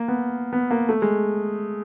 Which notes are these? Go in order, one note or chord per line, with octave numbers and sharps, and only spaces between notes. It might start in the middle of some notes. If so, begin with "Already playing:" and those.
Already playing: A#3
B3
B3
A#3
A3
G#3